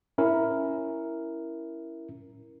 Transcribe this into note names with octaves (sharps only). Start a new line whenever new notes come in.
C#4 E4 A#4